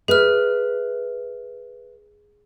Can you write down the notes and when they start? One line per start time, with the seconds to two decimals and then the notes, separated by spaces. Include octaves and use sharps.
0.08 G#4 B4 E5 F6